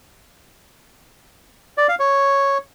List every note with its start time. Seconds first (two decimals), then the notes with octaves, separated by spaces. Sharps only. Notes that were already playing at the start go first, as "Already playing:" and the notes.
1.78 D5
1.89 F5
1.99 C#5